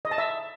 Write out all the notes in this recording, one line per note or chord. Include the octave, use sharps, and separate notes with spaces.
D#5
A5
E5